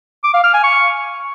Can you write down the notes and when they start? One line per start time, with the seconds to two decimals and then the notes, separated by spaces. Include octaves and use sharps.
0.24 D6
0.34 F5
0.44 F6
0.54 G#5
0.64 C#6